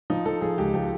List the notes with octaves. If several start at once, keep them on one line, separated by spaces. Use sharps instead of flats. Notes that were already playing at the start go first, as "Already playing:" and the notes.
F3 D#4
F3 A4
F3 G#4
C#2 G4
F3 G4